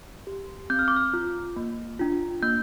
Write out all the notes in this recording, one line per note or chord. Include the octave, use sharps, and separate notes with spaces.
G4
C4 G6
F6
D6
F6
F4
A#3
D4 F4
A#3 G6